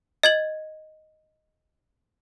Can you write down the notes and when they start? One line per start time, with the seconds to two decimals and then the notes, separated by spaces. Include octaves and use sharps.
0.23 D#5 G#6 F#7